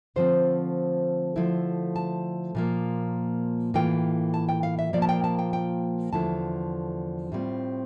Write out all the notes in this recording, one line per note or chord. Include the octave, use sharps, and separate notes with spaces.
D3 F3 A3 C4 C5
D3 F3 A3 E4
A5
A#2 F3 A#3
A2 E3 A#3 F4 G5
A5
G5
F5
E5
A#2 F3 A#3 D5
A5
G5
A5
G5
G5
E2 D3 F3 A3 E4 A5
A2 G3 C4 F4